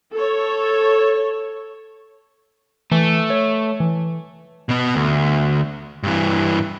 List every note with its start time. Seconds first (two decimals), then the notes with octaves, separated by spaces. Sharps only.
0.13 A4 C#5
2.92 E3 A3
3.30 C#5
3.80 E3
4.69 B2 B3
4.95 D2
6.03 G2 E3